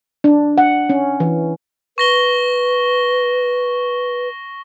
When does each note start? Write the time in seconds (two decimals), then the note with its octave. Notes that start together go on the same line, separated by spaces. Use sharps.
0.24 D4
0.58 F#5
0.90 C#4
1.20 E3
1.98 B4 C#6 A#6 G7